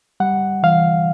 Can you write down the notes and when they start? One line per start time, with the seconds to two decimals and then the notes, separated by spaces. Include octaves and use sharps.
0.20 G3 F#5
0.63 E3 F5